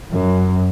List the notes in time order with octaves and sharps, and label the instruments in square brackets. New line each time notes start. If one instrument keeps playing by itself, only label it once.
[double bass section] F#2